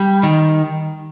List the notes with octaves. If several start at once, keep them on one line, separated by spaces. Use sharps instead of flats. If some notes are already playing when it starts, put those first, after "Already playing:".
Already playing: G3
D#3